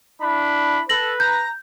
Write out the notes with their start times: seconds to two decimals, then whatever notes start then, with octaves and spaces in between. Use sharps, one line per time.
0.22 D4 E4 B5
0.89 A4 B4 A#6 F#7
1.20 A#5 G6